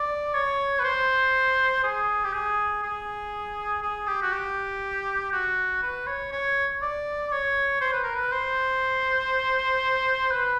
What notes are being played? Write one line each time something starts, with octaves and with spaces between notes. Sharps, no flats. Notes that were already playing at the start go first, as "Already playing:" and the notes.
Already playing: D5
C#5
B4
C5
G#4
G4
G#4
G#4
G#4
G4
F#4
G4
F#4
B4
C#5
C#5
D5
C#5
C5
B4
A#4
B4
C5
B4